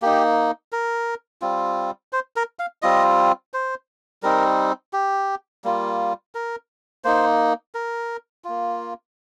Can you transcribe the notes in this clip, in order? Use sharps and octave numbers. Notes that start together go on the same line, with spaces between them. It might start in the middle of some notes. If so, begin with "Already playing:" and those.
A#3 D#4 G4
A#4
G3 C4 F4
C5
A#4
F5
G3 C4 F4 D#5
C5
G3 C4 D#4 A#4
G4
G3 A#3 F4
A#4
A#3 D#4 C5
A#4
A#3 F4